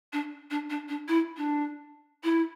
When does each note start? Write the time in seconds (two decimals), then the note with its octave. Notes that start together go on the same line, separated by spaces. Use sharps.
0.12 D4
0.50 D4
0.70 D4
0.88 D4
1.08 E4
1.37 D4
2.23 E4